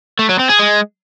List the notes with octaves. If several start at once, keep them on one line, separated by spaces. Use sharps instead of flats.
A3
F#3
C4
G#4
G#3